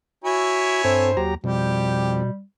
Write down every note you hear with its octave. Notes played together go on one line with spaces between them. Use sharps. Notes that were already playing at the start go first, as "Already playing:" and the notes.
E4 F#4 C#5 G#5
G2 C4 A4 C5
D#2 F#3 G4 A#5
F2 B2 G3 G4